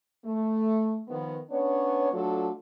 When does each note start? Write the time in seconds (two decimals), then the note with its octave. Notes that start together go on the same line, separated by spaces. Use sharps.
0.23 A3
1.08 D#3 F3 B3
1.50 B3 C#4 D4 C#5
2.13 F#3 A3 D4 F4 A4